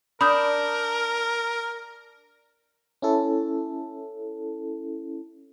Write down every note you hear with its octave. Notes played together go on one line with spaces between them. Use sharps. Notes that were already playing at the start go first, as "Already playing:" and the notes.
D4 A#4 B5 D#6 G6
C#4 E4 A4